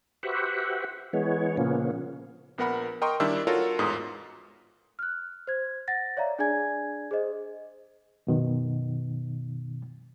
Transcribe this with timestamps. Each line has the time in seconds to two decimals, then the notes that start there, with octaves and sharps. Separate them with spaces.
0.23 F#4 G4 B4 C5 E5 F#5
1.13 E3 G#3 B3 C#5
1.57 A#2 C#3 F3 A#3 B3 C#4
2.58 A#1 B3 A#4 F#5 B5
3.02 A#4 D#5 G5 A#5 C6 C#6
3.20 D#3 G3 D4 E4 E5 E6
3.47 F4 F#4 A4 A#4 C#5
3.79 A1 E2 G#2 D#6
4.99 F6 F#6
5.47 C5 G#6
5.88 F#5 A6 A#6
6.17 C#5 D5 E5 F5 A#5
6.39 D4 G#4 D5 G#5 G#6
7.11 G#4 C5 D#5
8.27 F#2 B2 D#3